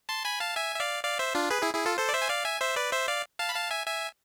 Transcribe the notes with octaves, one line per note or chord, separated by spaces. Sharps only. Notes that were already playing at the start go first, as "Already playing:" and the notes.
A5 C6
G#5 B5
F5 A5
E5 G#5
E5
D5 F5
D5 F5
C5 E5
D4 F4
G#4 B4
E4 G#4
E4 G#4
F4 A4
A4 C5
D5
C5 E5
G#5
D5 F5
E5 G#5
C5 E5
B4 D5
C5 E5
D5 F5
F5 A5
B5
F5 A5
E5 G#5
E5 G#5